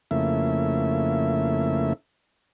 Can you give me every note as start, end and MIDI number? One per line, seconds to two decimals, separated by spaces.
0.11 1.93 41
0.11 1.93 49
0.11 1.93 57
0.11 1.93 58
0.11 1.93 64
0.11 1.93 76